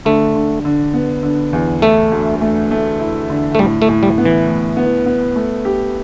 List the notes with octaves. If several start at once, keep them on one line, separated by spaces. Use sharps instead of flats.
D3 A3
D3
D3
B3
D3
E2
A3 E4
D2
A3
A3
E4
D3
A3
A2 G3
A3
A2
G3
B3
E3
A2
B3
B3
A3
G4